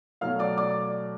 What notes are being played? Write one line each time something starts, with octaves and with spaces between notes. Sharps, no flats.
B2 F#3 A3 F5 F6
D5 D6
D5 D6